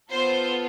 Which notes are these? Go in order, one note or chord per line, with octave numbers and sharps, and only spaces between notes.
B3 F4 A4 C5